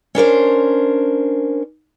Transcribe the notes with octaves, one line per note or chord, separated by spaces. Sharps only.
C#4 D4 A#4 C5